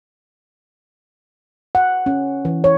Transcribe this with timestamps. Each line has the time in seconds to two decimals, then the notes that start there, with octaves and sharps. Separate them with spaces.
1.75 F#5
2.06 C#4
2.45 E3
2.64 C#5